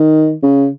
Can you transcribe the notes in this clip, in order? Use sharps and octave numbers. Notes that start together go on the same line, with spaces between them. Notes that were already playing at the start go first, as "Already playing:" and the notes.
Already playing: D#3
C#3